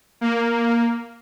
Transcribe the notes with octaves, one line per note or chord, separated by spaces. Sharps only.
A#3